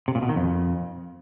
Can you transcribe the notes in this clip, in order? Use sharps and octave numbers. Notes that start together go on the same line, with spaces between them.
C3
A#2
B2
D#3
F2